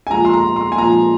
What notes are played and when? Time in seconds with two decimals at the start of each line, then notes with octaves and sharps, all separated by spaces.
0.07 G#5
0.11 A#2 F3 G#3 A#5
0.25 C6
0.34 A#5
0.56 C6
0.72 G#5
0.78 A#2 F3 G#3 A#5